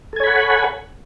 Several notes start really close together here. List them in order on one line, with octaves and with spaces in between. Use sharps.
A4 G#5 C#5 B5 F#5